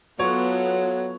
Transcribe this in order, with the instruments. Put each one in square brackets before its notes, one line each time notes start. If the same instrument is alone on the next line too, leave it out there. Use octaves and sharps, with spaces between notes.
[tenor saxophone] F#3 [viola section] B3 F4 A4 [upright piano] C#5